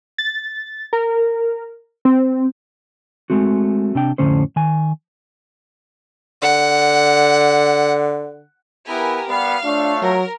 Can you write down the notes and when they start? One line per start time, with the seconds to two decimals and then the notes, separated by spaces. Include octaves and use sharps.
0.18 A6
0.93 A#4
2.05 C4
3.30 G#3 A3 C4 F#4
3.95 C3 D4 G5
4.18 F2 A2 D3 C#4 C5
4.56 D#3 G#5
6.42 D3 F#5
8.88 B3 E4 G4 A#4 G#5
9.28 G3 B3 F5
9.65 A3 D4 F4 C#5
10.02 F#3 A#4